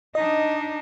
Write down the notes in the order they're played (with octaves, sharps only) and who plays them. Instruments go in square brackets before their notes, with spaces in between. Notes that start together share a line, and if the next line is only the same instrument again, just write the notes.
[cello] D4 D#4 [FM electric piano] D#5